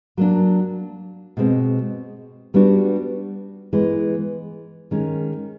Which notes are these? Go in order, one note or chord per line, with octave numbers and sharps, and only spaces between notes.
F#3 A#3 D4
B2 G#3 C4
G3 B3 D4 F#4
E3 G#3 B3
D#3 G#3 C#4